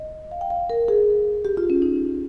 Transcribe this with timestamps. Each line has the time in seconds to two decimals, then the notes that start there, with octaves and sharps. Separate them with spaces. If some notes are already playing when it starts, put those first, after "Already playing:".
Already playing: D#5
0.31 F5
0.41 G5
0.50 F5
0.70 A#4
0.88 G#4
1.45 G4
1.57 F4
1.70 C#4
1.82 D#4